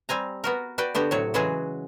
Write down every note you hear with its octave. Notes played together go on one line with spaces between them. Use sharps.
G3 C4 G#5 A#5
B3 F#4 A#4
F#4 B4 D5 G5
D3 B3 F#4 G4
A2 C3 F#3 C#5
C#3 E3 F#3 G#3 F#4 G#4